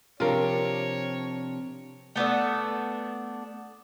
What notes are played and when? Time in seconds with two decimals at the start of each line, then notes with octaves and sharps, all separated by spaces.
0.20 C3 F3 D4 F4 A#4 C#5
2.16 A3 B3 D4 A4